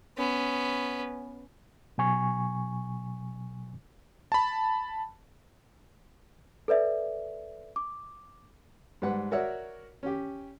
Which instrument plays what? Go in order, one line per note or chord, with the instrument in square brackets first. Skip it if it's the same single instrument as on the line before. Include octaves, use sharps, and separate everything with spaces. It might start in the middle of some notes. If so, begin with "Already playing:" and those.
[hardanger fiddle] B3 C#4
[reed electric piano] B2 F#3 G#5 C#6
[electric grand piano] A5 B5
[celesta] A4 B4 D5 E5
D6
[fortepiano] G#2 G3 B4 F#5
F#4 A#4 C#5 D5 E5 F#5
C#4 G4